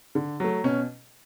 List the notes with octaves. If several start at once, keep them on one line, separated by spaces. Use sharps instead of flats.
D3
F#3 A3
B2 C#4